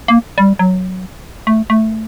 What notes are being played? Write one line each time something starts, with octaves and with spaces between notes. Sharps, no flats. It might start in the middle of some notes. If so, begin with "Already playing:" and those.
A#3
G3
F#3
A3
A3